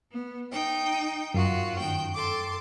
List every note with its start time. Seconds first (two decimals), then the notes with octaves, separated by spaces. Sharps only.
0.12 B3
0.51 D#4 G5
1.34 F#2 F4 F#4
1.78 D#3 G5
2.14 A4 C6 D6